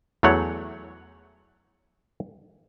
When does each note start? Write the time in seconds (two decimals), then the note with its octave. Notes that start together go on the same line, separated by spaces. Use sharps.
0.23 E2 E3 F#3 A3 C#5 F#5